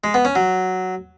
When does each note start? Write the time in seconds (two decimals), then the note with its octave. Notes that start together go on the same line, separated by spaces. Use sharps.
0.04 G#3
0.14 B3
0.25 C#4
0.35 F#3